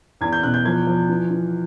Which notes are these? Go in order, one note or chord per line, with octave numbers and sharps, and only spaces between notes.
E2 G#6
G6
B2 F#6
G6
F3 G#6
F3
E3
E3